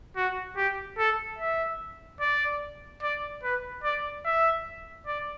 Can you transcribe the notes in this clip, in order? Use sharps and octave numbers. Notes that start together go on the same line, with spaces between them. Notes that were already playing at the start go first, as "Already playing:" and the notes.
F#4
G4
A4
E5
D5
D5
B4
D5
E5
D5